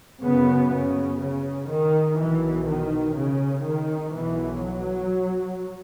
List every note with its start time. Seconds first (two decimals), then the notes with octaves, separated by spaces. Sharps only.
0.22 F#1 F#2 C#3 B3
0.71 C#3
1.20 C#3
1.70 D#3
2.18 B1 B2 E3
2.68 D#3
3.17 C#3
3.66 D#3
4.15 B1 B2 E3
4.63 F#3